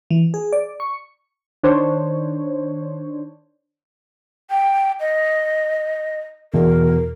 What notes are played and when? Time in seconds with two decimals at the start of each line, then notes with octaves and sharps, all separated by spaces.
0.11 E3
0.34 G#4
0.53 D5
0.80 C#6
1.63 D#3 D4 C5 C#5
4.50 G5
5.00 D#5
6.54 E2 B2 A#4